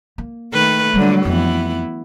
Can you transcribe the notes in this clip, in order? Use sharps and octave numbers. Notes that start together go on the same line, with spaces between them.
A#3
D#3 A3 B4
D3 F#3 G3 A#3
F2 E3 B3 E4